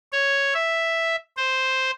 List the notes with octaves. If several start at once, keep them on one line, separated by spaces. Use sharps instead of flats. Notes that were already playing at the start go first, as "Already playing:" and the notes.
C#5
E5
C5